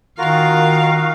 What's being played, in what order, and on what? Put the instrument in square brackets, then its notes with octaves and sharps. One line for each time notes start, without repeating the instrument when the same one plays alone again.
[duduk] D#3 [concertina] F4 F#4 A#4 [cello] F5